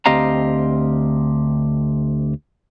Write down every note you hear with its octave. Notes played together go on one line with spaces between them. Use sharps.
D2 C4 G4 D#5 F5 A#5